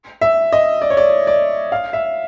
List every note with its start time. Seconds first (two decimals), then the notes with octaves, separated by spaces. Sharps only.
0.21 E5
0.53 D#5
0.82 D5
0.90 C#5
0.97 D5
1.27 D5
1.72 F5
1.93 E5